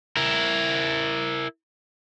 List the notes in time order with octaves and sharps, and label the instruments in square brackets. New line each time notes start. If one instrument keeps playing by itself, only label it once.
[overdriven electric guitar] E4 A#4